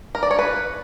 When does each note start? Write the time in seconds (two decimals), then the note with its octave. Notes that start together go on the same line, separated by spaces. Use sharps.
0.15 A#4
0.23 D5
0.31 C#5
0.39 B4